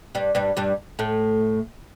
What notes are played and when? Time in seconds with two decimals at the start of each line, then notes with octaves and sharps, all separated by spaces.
0.15 G2 G3
0.35 G2 G3
0.57 G2 G3
0.99 A2 A3